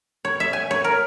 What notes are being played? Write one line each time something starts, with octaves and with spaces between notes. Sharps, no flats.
C#5
E5
G#5
C#5
A#4